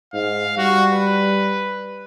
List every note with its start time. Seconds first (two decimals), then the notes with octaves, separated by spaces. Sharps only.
0.14 G#2 F5
0.58 G3 F#4
0.92 B4